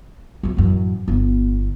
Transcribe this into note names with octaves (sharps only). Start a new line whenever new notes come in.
F#2 F3
A1 F#2
G1 B3